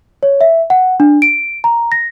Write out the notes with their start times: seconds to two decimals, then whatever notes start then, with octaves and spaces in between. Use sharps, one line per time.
0.23 C#5
0.41 E5
0.70 F#5
1.00 D4
1.22 D7
1.64 A#5
1.92 A#6